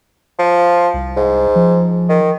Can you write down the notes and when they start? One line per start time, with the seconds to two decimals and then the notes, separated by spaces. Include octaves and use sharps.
0.39 F3
0.94 C2
1.17 G#2
1.55 F3
2.09 D#3